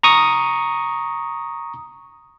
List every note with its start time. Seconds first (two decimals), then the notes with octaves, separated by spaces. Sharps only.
0.03 A#5 C#6 D#6